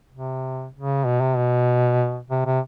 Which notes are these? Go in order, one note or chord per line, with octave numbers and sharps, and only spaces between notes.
C3
C#3
B2
C3
B2
C3
C3